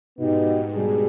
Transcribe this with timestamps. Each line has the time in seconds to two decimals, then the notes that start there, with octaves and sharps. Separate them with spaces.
0.17 G#2 B2 B3 D#4 G4
0.73 G#2 B2 G3 D4 G#4